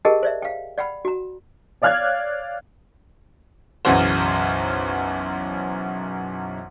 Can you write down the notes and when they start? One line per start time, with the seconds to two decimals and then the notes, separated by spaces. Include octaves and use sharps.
0.05 G4 G#4 A#4 D#5 F#5 A5
0.23 C5 D5 E5
0.42 F5 G5
0.78 D5 F#5 G5 B5
1.05 F#4 A#5
1.82 C#5 D5 F5 F6 F#6 G#6
3.85 B1 F#2 C#3 E3 F#4 C5